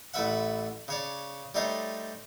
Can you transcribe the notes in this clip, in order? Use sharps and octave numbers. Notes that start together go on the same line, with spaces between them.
A1 A3 B4 E5 F#5
C#3 C#5 D5
G3 A3 D#4 C5 C#5